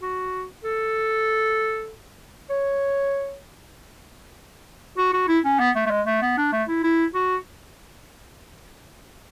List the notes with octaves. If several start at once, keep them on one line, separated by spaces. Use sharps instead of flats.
F#4
A4
C#5
F#4
F#4
E4
C#4
B3
A3
A3
G#3
A3
B3
D4
A3
E4
E4
F#4